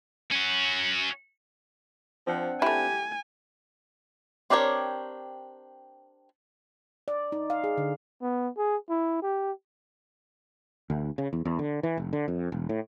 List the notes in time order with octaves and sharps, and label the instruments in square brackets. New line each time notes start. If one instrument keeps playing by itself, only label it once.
[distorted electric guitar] C#4 F#4
[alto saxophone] F3 [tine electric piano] C4 D4 F#5
[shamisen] A3 E4 [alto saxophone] G4 [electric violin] G#5
[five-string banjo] C4 D4 G4 A#4 C#5
[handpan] D5
D#4
F5
G#4
D3
[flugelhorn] B3
G#4
E4
G4
[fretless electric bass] D2
C#3
E2
E2
D3
E3
F1
D3
F2
E1
A2